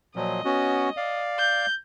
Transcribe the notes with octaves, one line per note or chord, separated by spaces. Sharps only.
A#2 F3 F#3 D#5
B3 C#4 F#4
D5 F5
G6